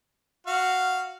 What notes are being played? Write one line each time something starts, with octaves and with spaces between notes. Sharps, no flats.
F#4 F5